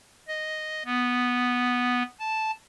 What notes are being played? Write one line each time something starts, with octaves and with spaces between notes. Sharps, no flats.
D#5
B3
A5